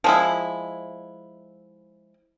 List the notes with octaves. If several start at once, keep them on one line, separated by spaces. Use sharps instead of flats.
F3 G#3 E4